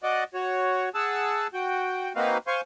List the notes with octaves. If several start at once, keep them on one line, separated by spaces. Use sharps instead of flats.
F#4 D5 D#5
F#4 C#5
G#4 F#5 A5 E6
F#4 G5
A#3 C4 D#4 F#4 B4 F5
C5 F5 G#5 C6 C#6